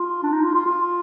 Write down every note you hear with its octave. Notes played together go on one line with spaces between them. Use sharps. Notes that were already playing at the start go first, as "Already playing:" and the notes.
Already playing: F4
D4
D#4
F4
F4
F4